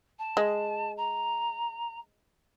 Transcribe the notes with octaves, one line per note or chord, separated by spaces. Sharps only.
A5
G#3
A#5